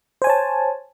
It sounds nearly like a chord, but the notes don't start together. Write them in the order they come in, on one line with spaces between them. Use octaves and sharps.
C5 G#5 C#5 A5